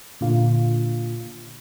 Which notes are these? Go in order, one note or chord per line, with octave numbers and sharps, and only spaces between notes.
A#2 D3 F4